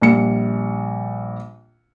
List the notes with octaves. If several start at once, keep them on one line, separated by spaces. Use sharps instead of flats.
A#1 G3 C#7